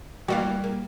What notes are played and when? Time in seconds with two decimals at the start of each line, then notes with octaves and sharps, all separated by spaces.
0.28 E3 G3 A#3 F#4 D5 F5
0.64 A#3